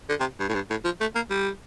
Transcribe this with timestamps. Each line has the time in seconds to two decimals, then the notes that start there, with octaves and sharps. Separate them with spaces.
0.09 D3
0.20 C3
0.40 G2
0.49 A2
0.54 G2
0.70 A2
0.84 F3
1.01 A3
1.15 A#3
1.30 G3